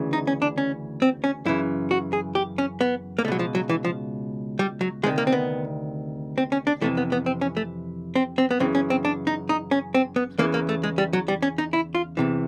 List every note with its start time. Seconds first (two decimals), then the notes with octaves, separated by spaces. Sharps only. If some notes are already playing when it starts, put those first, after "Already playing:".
Already playing: D2 C#3 E3
0.13 D#4
0.27 C#4
0.42 D4
0.58 C#4
1.02 C4
1.24 C#4
1.45 F#2 C#3 E3 E4
1.91 F#4
2.13 G#4
2.35 G4
2.58 C#4
2.81 B3
3.19 A#3
3.25 C#2 A3
3.28 B2 F#3
3.39 F3
3.55 F#3
3.69 E3
3.85 F3
4.59 G3
4.81 F#3
5.03 D2 C3 D#3 G#3
5.18 A#3
5.27 C4
5.32 B3
6.38 C4
6.52 C#4
6.67 D4
6.81 F2 C3 E3 A3
6.97 B3
7.12 B3
7.26 C4
7.41 C#4
7.57 A3
8.15 C4
8.38 C4
8.51 B3
8.60 F#2 C#3 E3 C4
8.75 C#4
8.90 C4
9.05 D4
9.27 D#4
9.49 D#4
9.71 C#4
9.94 C4
10.16 B3
10.38 E2 C#3 E3 A#3
10.54 A#3
10.69 A3
10.83 G#3
10.98 G3
11.13 F#3
11.28 G3
11.42 C#4
11.58 D#4
11.73 E4
11.95 F4
12.17 E2 C3 E3